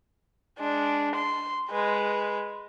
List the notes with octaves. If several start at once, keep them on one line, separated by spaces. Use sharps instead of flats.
G#3 D4
C6
G#3 B4